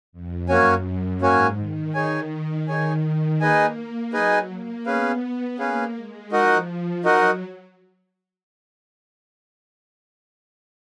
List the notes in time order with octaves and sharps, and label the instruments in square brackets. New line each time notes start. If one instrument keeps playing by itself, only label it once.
[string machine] F2
[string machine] F#2 [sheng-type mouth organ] A#3 C#4 F#4 C#5 G#5
[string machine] G#2 [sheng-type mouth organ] A#3 C#4 F#4 C#5 G#5
[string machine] D#3
[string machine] D#3 [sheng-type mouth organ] D#4 G#4 C#5 G#5
[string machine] D#3 [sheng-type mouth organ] D#4 G#4 C#5 G#5
[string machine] A#3 [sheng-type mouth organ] D#4 G#4 B4 D#5 G#5
[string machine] F#3 [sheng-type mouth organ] D#4 G#4 B4 D#5 G#5
[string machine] A#3
[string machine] B3 [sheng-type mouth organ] C#4 G#4 B4 F5
[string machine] A#3 [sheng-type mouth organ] C#4 G#4 B4 F5
[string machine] G#3
[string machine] F3 [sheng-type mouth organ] D#4 F#4 A#4 D#5 F#5
[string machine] F#3 [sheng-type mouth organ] D#4 F#4 A#4 D#5 F#5